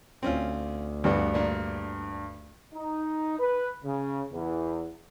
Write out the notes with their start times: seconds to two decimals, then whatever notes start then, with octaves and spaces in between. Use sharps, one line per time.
0.23 D2 C4 C#4 F4
1.04 G2 E3 G3 B3
1.34 A#2 D4
2.75 D#4
3.40 B4
3.84 C#3
4.33 E2